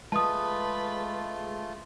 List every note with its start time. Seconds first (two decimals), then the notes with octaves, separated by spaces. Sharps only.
0.12 G#3 A3 F4 B4 A5 D#6